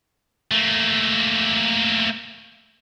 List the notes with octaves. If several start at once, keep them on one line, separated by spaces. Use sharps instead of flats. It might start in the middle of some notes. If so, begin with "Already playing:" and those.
A3 A#3